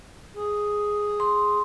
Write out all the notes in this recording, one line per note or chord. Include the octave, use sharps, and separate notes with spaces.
G#4
C6